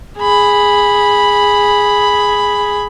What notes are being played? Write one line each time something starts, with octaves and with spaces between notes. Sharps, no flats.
G#4 B5